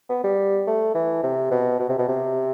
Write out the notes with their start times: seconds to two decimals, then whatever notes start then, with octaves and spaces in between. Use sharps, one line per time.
0.09 B3
0.24 G3
0.67 A3
0.94 E3
1.23 C3
1.51 B2
1.79 B2
1.89 C3
1.98 B2
2.08 C3